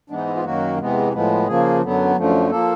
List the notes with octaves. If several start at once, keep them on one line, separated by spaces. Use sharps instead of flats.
G#2 E3 G#3 B3 D4
D#4
E4
F4
F#2 D#3 F#3 A#3 F#4
E2 C3 E3 G#3 B3
A2 F3 G#3 B3
C#3 F3 A#3 G#4
F#2 D3 F#3 B3
F#2 D3 F3 A3
F3 A#3 A4